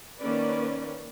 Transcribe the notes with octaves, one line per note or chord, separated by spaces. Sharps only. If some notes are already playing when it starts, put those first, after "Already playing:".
D#3 A#3 C#4 B4 D5